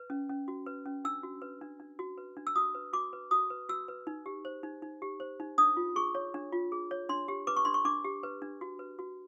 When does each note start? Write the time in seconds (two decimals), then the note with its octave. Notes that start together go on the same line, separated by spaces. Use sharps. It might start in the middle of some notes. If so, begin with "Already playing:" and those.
Already playing: B4
0.10 C#4
0.29 C#4
0.48 F#4
0.66 B4
0.86 C#4
1.05 D4 E6
1.23 F#4
1.42 B4
1.61 D4
1.80 D4
1.99 F#4
2.18 B4
2.37 D4
2.47 E6
2.56 F#4 D#6
2.75 B4
2.93 F#4 D6
3.13 B4
3.31 F#4 D#6
3.50 B4
3.69 F#4 E6
3.88 B4
4.07 D#4
4.26 G4
4.45 C5
4.63 D#4
4.82 D#4
5.02 G4
5.20 C5
5.40 D#4
5.58 D4 D#6
5.77 F4
5.96 G#4 C#6
6.15 C#5
6.34 D4
6.53 F4
6.72 G#4
6.91 C#5
7.09 D4 C6
7.28 G4
7.47 B4 D6
7.56 C#6
7.65 D4 C6
7.74 C#6
7.85 D4 D6
8.05 G4
8.23 B4
8.42 D4
8.61 F#4
8.79 B4
8.99 F#4